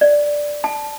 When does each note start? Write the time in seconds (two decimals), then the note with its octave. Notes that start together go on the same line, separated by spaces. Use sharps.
0.01 D5
0.64 A5